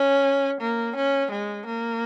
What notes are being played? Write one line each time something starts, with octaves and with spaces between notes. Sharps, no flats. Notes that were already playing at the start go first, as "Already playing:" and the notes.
Already playing: C#4
A#3
C#4
G#3
A#3